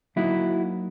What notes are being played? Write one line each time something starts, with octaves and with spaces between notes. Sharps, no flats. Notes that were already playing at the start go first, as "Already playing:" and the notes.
F#3 A#3 D#4 E4 F#4